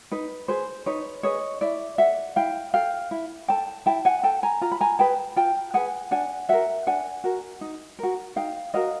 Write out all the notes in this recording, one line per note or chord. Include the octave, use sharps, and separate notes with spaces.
D#4 B4
G#4 B4 C5
D#4 B4 C#5
G#4 B4 C#5 D#5
E4 D5 E5
A4 E5 F#5
E4 F5 G5
A4 F5 G5
E4
A4 G5 A5
E4 G5 A5
F#5 G#5
A4 G5 A5
G#5 A#5
F4 A#5
B5
G#5 A#5
G#4 B4 G5 A5
F4 G5 A5
G#4 B4 F#5 G#5
D4 F#5 G#5
F#4 A#4 E5 F#5
D4 F#5 G#5
F#4 A#4
D#4
F#4 A#4
D#4 F5 G5
F#4 A#4 D#5 F5